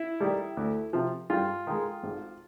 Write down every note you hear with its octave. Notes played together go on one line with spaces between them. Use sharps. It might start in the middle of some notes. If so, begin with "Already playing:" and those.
Already playing: E4
D#3 G3
D2
C3 F3
G2 F4
D#3 G#3
G#1